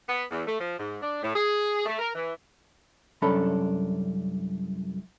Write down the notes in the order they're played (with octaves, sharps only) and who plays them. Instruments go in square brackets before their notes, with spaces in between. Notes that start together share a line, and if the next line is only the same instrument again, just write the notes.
[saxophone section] B3
E2
A3
F3
G#2
D4
A2
G#4
A3
A#4
E3
[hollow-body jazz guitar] C2 F#2 C#4 D4 A4 B5